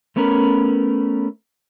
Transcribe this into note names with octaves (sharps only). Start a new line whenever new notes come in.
A3 B3 C#4 A#4 B4